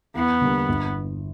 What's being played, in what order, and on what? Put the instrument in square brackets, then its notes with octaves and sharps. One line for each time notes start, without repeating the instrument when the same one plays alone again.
[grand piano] E2 [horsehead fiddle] B3
[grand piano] D3 G3 A#3
G1